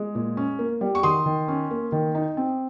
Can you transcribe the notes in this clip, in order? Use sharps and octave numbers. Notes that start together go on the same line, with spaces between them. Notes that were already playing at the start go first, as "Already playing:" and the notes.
Already playing: G#3
A#2
C#4
A#3
G3
C#6
D#3 C6 D#6
D#3
C#4
A#3
D#3
D#4
C4